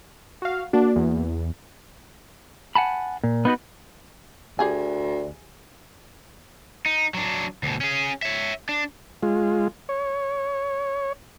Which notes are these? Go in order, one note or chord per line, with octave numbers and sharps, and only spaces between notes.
F#4 F5
A#3 D4 F#4
E2
F#5 G#5 A5 B5
A#2
B3 D#4 F#4 B4
D2 G4 G#4 G#5
D#4
F#3 D4
D2 B2
C#4 G#4
C#5 E5
D4
G#3 F4
C#5